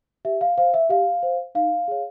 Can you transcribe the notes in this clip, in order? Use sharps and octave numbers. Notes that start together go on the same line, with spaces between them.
G4 E5
F5
C5 F5
E5
G4 F5
C5
D#4 F5
G#4 C#5